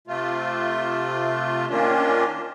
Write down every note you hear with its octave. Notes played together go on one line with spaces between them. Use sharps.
C3 A3 F4
D#3 A#3 C#4 D4 F4